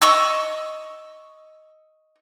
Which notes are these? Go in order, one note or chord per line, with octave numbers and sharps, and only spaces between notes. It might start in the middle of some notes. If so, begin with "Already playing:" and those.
D#5 C#6 E6